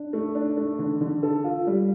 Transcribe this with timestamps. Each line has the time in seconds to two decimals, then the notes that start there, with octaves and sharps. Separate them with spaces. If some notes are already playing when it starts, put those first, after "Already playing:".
Already playing: D4
0.13 A3
0.35 D4
0.57 A3
0.79 D3
1.01 D3
1.23 A4
1.44 F4
1.67 G3